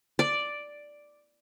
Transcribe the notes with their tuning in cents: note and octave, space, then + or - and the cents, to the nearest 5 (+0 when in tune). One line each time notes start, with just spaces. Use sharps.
D5 +0